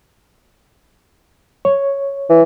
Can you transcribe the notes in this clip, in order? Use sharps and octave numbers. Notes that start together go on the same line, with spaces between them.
C#5
E3